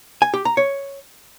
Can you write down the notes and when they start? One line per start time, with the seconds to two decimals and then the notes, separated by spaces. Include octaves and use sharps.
0.22 G#5
0.34 G4
0.45 A#5
0.57 C#5